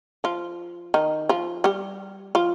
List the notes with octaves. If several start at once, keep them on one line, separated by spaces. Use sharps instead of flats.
F3 F4
D#3 D#4
F3 F4
G3 G4
F3 F4